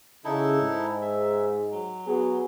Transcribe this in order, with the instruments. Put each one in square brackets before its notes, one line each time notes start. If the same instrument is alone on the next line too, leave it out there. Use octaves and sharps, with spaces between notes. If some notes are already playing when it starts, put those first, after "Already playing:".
[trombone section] C#3 [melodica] D#4 E4 A4
[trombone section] G#2
[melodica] E5
F#3
[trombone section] B3 F#4 G#4